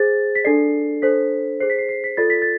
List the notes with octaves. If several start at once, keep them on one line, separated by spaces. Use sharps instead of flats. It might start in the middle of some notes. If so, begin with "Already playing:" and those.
Already playing: G#4 C5 A6
B6
D4 A4 D5 C7
D4 A4 C5 B6
G#4 C5 C7
B6
C7
C7
B6
F4 A4 D5 A6
B6
A6